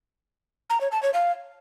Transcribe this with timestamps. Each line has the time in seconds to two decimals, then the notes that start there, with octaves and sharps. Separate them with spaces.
0.70 A#5
0.81 C#5
0.92 A5
1.03 C#5
1.14 F5